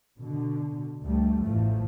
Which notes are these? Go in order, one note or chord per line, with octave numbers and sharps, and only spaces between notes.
B2 D3
D2 G3 A3
A1 E2 E3 F3 A3